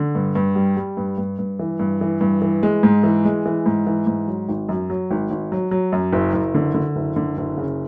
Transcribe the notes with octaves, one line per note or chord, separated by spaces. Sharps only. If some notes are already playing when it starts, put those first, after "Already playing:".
Already playing: D3
G2
G2
G3
G3
G2
G2
G2
E3
G2
E3
G2
E3
G#3
G#2
E3
G#3
E3
G#2
E3
G#2
F#3
G#1
F#2
F#3
G#1
G#1
F#3
F#3
F#2
F#1
F#1
D3
D3
F#1
D3
F#1
C#3